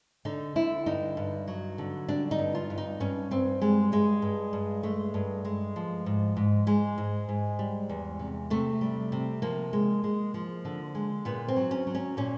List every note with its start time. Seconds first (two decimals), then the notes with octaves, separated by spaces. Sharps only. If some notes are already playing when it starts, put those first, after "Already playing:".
0.25 D3 D#4
0.55 D3 E4
0.86 G2 D#4
1.17 G2
1.48 F#3
1.78 D3
2.08 G3 D4
2.31 D#4
2.39 G2
2.55 F4
2.70 G2
2.78 D#4
3.00 G2 C#4
3.31 G2 C4
3.61 G3 G#3
3.92 G2 G#3
4.22 G2
4.53 G2
4.83 G#3 A3
5.14 G2
5.45 G#3
5.76 F3
6.06 G#2
6.37 G#2
6.67 G#2 G#3
6.98 G#2
7.29 G#2
7.59 G3
7.90 E2
8.19 C3
8.50 C3 A3
8.81 G3
9.12 C3
9.42 F3 A#3
9.73 G#3
10.04 G#3
10.34 F3
10.65 D3
10.95 G#3
11.25 A#2 B3
11.48 C4
11.56 F#3
11.71 C#4
11.87 F#3
11.95 C#4
12.17 A#2 C#4